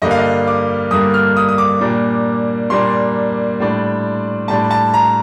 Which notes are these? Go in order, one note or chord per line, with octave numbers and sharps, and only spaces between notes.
G2 D3 G3 A#3 D#5
F5
D#5
D6
G2 D3 G3 A#3 D#6
F6
D#6
D#6
D6
A#2 G3 A#3 D4
A#2 G3 A#3 D4 C6
A2 G3 D4
A2 G3 D4 A5
A5
A#5